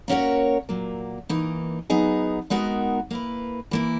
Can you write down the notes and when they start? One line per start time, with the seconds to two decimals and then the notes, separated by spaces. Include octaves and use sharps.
0.08 A#3 C#4 F#4 A#4 C#5
0.69 A#2 F#3 A#3
1.29 E3 A#3 D#4
1.90 F#3 B3 D#4 G#4
2.50 G#3 B3 D#4 F#4 A#4
3.11 A#3 E4 B4
3.71 E3 A#3 E4